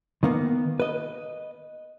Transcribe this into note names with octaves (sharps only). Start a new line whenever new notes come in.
D#3 A#3 B3
B4 D#5